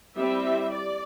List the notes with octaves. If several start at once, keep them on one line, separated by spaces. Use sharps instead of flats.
G3 C4 E4 E5
D5